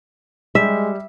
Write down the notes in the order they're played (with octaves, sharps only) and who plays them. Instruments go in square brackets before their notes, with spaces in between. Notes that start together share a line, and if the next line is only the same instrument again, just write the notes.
[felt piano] G3 G4 [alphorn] G#3 [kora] E5